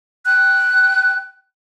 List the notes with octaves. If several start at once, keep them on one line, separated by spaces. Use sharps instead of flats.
G5 F#6